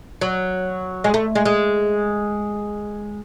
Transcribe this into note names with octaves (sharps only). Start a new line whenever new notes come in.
F#3
G#3
A3
G#3
G#3